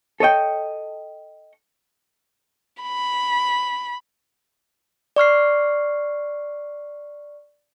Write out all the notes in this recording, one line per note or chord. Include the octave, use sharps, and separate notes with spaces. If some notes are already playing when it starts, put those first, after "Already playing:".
A4 C#5 D#5 G5
B5
D5 C#6 F6 C7